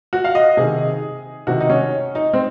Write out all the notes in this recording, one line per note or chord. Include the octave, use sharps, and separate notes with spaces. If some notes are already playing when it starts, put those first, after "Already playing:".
F#4
F5
D#5
C3 D#3 G#4
C3 D#3 F#4
D#4
C#4
D#4
C4